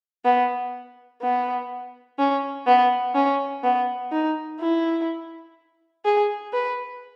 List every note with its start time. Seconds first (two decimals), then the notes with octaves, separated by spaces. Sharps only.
0.25 B3
1.22 B3
2.19 C#4
2.67 B3
3.15 C#4
3.64 B3
4.12 D#4
4.60 E4
6.05 G#4
6.53 B4